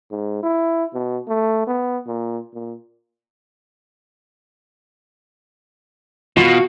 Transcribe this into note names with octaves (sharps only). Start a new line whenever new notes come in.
G#2
E4
B2
A3
B3
A#2
A#2
B2 F4 F#4